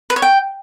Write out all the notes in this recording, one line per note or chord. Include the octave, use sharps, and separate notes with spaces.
B4
C#5
G5